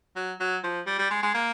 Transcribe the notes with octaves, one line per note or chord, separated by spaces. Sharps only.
F#3
F#3
F3
G3
G3
G#3
G#3
A#3